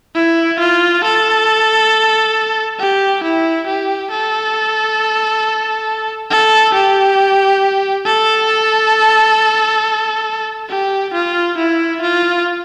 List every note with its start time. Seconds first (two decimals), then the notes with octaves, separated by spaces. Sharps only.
0.15 E4
0.59 F4
1.03 A4
2.79 G4
3.23 E4
3.67 G4
4.11 A4
6.30 A4
6.74 G4
8.06 A4
10.69 G4
11.14 F4
11.58 E4
12.01 F4